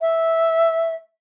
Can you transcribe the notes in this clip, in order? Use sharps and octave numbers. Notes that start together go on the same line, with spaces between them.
E5